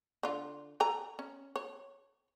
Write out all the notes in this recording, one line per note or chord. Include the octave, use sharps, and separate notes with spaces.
D3 F4
A4 G#5 A#5
C#4
C#5